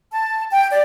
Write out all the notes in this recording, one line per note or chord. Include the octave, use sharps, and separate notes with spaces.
A5
G5
D5